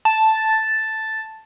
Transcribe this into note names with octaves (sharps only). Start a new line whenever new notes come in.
A5